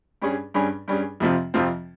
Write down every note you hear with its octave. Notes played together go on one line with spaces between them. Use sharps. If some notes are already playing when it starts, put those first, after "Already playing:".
G2 G3 C#4 G#4
G2 G3 C#4 G#4
G2 G3 C#4 G#4
F2 C3 F3 C4 F4
F2 C3 F3 C4 F4